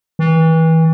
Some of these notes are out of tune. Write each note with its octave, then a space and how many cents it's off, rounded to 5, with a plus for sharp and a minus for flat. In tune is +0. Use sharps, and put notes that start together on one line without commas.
E3 -30